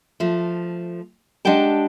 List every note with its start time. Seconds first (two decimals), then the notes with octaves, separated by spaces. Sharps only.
0.20 F3 A3
1.45 G#3 D4 G4 F#5 G5 A5